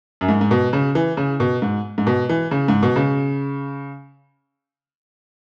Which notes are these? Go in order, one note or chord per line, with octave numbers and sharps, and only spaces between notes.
F#2
G#2
G#2
B2
C#3
E3
C#3
B2
G#2
G#2
B2
E3
C#3
G#2
B2
C#3